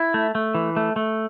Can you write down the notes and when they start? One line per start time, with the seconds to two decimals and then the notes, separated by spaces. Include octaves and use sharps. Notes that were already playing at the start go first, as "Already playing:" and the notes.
Already playing: E4
0.14 A3
0.35 A3
0.55 E3
0.77 A3
0.96 A3